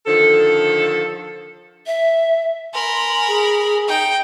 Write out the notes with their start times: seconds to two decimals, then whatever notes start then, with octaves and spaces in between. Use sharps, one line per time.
0.07 D3 D#3 F3 A4
1.86 E5
2.74 A#4 G#5 B5 C6
3.28 G#4
3.87 D#4 G5